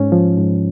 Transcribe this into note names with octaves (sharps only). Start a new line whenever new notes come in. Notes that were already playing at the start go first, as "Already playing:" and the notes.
Already playing: G#2 C#4
F3
G#2